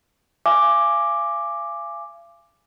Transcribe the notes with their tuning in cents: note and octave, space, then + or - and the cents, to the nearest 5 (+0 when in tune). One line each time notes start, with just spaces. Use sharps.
F5 -40 G#5 +0 D6 +5